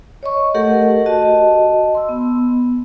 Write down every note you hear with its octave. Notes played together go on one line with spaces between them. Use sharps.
C#5 D#5 C#6
A3 G4 A4 A#4 D#5 F#5
F#4 D#5 A5
C6 E6
B3